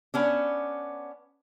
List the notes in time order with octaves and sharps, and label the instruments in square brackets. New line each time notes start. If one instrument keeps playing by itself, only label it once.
[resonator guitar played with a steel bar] B3 C#4 D4